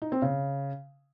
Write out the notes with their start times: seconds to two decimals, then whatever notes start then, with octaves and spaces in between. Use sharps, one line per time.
0.02 D#4
0.12 C4
0.22 C#3